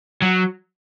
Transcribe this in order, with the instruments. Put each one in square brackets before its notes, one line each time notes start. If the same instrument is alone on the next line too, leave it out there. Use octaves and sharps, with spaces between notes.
[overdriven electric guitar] F#3